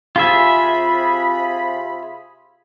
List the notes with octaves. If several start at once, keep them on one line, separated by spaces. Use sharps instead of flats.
C3 F4 G#4 E5 B5